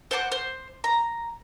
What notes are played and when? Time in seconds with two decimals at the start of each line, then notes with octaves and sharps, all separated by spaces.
0.11 C5 F#5 A5 D6
0.32 C5
0.84 A#5